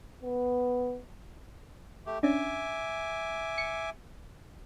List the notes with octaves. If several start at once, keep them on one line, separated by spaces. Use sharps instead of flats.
B3
A3 G4
C#4 D4 E5 G#5 D6
C#7